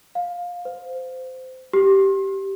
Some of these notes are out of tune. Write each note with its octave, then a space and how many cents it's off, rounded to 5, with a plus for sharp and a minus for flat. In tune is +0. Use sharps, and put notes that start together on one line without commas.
F5 +15
C5 -20
G4 -15